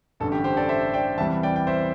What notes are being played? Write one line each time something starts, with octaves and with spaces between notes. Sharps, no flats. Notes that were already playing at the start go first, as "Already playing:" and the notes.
A1 G2 D3 A3 A4
G4
G4 C5
A4 D5
C5 E5
D5 G5
E2 C3 E3 G3 E5 A5
D5 G5
G5
C5 E5